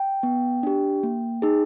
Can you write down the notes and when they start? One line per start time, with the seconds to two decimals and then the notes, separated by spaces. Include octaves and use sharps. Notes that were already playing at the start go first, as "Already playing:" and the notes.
Already playing: G5
0.23 B3
0.63 D4 G4
1.03 A#3
1.42 D#4 G#4